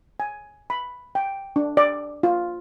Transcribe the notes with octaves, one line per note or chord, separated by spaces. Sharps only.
G#5
B5
G5
D4
D5
F4